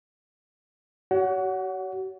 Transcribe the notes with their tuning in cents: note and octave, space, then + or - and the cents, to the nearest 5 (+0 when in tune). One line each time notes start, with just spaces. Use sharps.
F#4 +45 C#5 +30 F#5 +0